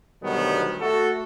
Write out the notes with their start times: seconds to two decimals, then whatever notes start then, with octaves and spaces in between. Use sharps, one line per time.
0.23 D2 B2 D#3 F#3 G3 B3
0.81 A3 F#4 A4